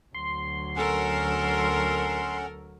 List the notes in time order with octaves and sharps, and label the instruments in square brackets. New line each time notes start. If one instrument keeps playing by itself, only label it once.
[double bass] D2 F#3 [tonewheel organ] C6
[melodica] C#4 F#5 [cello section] A4 A#4